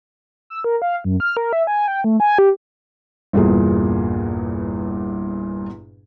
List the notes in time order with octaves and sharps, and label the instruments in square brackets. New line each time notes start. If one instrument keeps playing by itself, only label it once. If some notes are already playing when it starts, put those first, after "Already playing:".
[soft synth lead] E6
A#4
F5
F#2
F6
A#4
E5
G#5
G5
A3
G#5
G4
[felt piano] G1 E2 G2 A#2 G#4